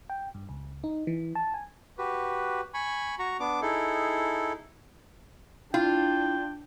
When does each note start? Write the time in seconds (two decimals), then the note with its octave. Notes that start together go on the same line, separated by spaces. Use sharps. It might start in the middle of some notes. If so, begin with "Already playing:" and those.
0.10 G5
0.35 G2
0.49 C#2
0.84 D#4
1.07 E3
1.35 A5
1.54 G#5
1.98 F#4 G4 B4
2.74 G#5 B5 C#6
3.19 F#4 A#5 C#6
3.40 B3 D4 D6
3.62 D#4 E4 G#4 A4
5.74 D4 E4 F4 G5